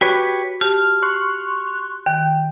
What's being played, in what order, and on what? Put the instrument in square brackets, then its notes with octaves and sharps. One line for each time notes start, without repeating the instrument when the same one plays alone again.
[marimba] F#4 [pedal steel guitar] G4 B4 C#5
[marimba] G4 A5 [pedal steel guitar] F6
[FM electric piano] C6 C#6 F#6
[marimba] D#3 [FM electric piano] G5